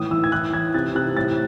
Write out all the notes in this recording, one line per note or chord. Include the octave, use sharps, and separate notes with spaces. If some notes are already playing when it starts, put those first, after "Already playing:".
Already playing: A2 E3 D#6
E3 E6
G#6
E3 F#6
E3 G#6
C3 A6
C3 F#6
A2 A6